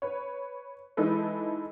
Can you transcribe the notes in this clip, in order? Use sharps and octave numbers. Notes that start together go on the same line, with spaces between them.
B4 C#5
E3 G#3 D#4 E4 A4 B4